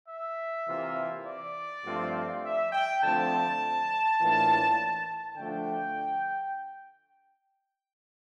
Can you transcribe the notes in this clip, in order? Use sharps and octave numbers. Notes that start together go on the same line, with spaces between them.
E5
C3 E3 A#3 F4
D5
G2 F3 A3 C4 F4
E5
G5
D3 F3 A3 C4 A5
A2 E3 A#3 D4 F4
D3 F3 A3 D4 G5